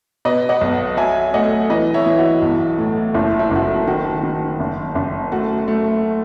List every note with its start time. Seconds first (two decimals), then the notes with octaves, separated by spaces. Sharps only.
0.25 B2 B4 D#5
0.49 D#5 F#5
0.61 B1
0.97 F#3 E5 G#5
1.34 A3 D#5 F#5
1.70 E3 B4 D#5
1.94 C#5 E5
2.06 E3
2.18 F#4
2.42 B1
2.78 A2
3.14 F#1 E4
3.39 E4
3.51 F#1 F#4
3.63 E4
3.87 D#3 F#4
4.23 D#3
4.60 F#1
4.95 F#1
5.32 A3 F#4
5.68 A3